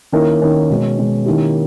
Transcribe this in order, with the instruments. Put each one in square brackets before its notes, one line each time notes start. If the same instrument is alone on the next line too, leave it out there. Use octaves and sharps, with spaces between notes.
[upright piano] D#3 A#3 C#4 E4 A#4
D#3 A#3 C#4 E4 A#4
B2 G#3 C#4
B2 G#3 C#4
D#3 A#3 C#4 E4 G4